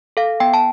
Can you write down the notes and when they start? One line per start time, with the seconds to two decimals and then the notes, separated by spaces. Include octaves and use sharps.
0.17 A4 F5
0.40 B3 G5
0.54 A5